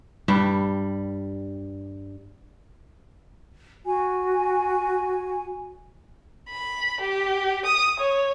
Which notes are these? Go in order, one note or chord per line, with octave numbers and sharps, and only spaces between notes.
G2 G3
F#4 G#5
B5
G4
D#6
C#5